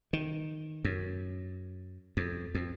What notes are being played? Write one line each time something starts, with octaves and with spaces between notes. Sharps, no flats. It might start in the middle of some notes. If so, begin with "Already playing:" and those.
D#3
F#2
F2
F2